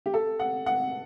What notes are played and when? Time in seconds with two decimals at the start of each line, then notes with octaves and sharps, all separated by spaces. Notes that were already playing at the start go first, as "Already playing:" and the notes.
0.06 G4
0.14 A4
0.40 F#5
0.66 F#5